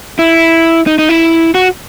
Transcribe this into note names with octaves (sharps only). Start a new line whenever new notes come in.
E4
D#4
D#4
E4
F#4